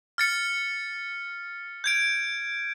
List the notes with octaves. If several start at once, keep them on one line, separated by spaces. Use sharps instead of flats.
F6 A6 C#7
G6 G#6 D7